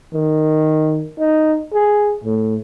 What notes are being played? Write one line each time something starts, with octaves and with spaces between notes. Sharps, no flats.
D#3
D#4
G#4
A2